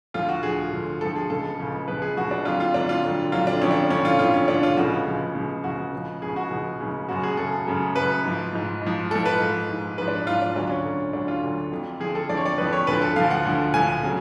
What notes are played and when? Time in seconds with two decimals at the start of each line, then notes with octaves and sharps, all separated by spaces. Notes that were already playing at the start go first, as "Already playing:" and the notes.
0.14 D2 D3 F3 F4
0.29 F#4
0.43 D2 D3 F3 G#4
0.72 D2 D3 F3
1.01 D2 D3 F3 A4
1.15 G#4
1.30 C#2 C#3 F3 A4
1.58 C#2 C#3 F3
1.88 C#2 C#3 F3 B4
2.02 G#4
2.17 C#2 C#3 F3 F#4
2.31 D4
2.45 F2 D3 F#3 F4
2.60 F4
2.74 F2 D3 F#3 D4
2.89 F4
3.04 F2 D3 F#3
3.32 F2 D3 F#3 F4
3.47 D4
3.61 F2 D3 F3 C#4
3.71 D4
3.90 F2 D3 F3 C#4
4.05 F4
4.19 F2 D3 F3 F4
4.34 C#4
4.48 F2 D3 F3 D4
4.63 F4
4.77 C#2 C#3 F3 F#4
5.06 C#2 C#3 F3
5.35 C#2 C#3 F3
5.64 C#2 C#3 F3 F#4
5.93 C#2 C#3 F3
6.22 C#2 C#3 F3 G#4
6.36 F#4
6.50 C#2 C#3 F3
6.80 C#2 C#3 F3
7.08 F#2 C#3 F#3 F#4
7.23 G#4
7.37 F#2 C#3 F#3 A4
7.67 F#2 C#3 F#3
7.95 F#2 C#3 F#3 B4
8.24 G#2 F3
8.53 G#2 F3
8.82 G#2 F3
9.11 G#2 F3 A4
9.25 B4
9.40 G#2 F3
9.69 G#2 F3
9.97 G#2 B4
10.02 F3
10.08 D4
10.27 G#2 F3 F4
10.42 D4
10.55 D2 D3 F#3 D4
10.70 C#4
10.85 D2 D3 F#3
11.13 D2 D3 F#3 D4
11.28 F4
11.43 D2 D3 F#3
11.72 F2 D3 F3
12.00 F2 D3 F3 G#4
12.15 A4
12.29 F2 D3 F3 D5
12.37 C#5
12.46 D5
12.58 F2 D3 F3 B4
12.73 C#5
12.87 D2 D3 F3 B4
13.02 A4
13.16 D2 D3 F3 F5
13.31 F#5
13.45 D2 D3 F3
13.74 D2 D3 F3 G#5
14.03 C#3 F#3